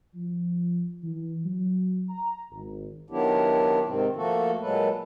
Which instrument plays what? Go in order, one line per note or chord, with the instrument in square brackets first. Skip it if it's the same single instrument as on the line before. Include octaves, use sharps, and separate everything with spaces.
[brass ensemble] F3
E3
F#3
A#5
G#1
[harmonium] D#3 F#3 B3 D4 E4 G4
G#2 C3 D#3 C4
F3 A3 A#3 F#4 A4
A#2 F#3 G#3 A4 B4